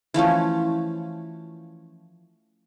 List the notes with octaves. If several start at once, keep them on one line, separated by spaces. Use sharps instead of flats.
E3 F3 A3 C#4